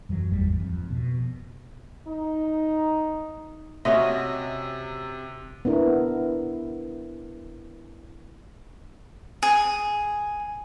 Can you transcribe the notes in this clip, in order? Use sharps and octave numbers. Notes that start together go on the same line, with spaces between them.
F#2 E3 F#3
G1 E2 G#2 G3
G#2
F2
B2
D#4
C3 C#4 F#4 D#5 E5 C6
B3 D4 E4 A#4
G#4